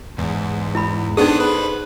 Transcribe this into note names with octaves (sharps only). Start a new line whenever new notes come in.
E2 G#2
E4 B5
B3 D4 D#4 G#4 A4 C5 D#6
B4